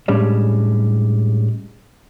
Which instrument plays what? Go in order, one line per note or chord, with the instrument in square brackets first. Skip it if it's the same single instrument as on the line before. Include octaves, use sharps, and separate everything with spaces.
[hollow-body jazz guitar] A2 G3 G#3 C#4 D4